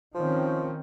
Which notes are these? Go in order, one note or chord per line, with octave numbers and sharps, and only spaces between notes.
D#3 F3 C4 C#4